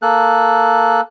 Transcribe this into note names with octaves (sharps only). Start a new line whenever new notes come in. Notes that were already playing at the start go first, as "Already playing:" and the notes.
A#3 A4 F#6